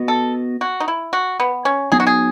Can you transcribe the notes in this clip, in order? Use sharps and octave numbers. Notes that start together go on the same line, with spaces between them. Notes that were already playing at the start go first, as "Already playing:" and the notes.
Already playing: B3 F#4 B4 D#5
A4
F#4
D#4
E4
F#4
B3
C#4
F#3 B3 D#4 G#4
F#4
G#4